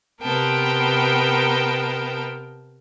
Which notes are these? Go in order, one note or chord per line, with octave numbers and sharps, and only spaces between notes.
C3 B3 A#4 G5 A5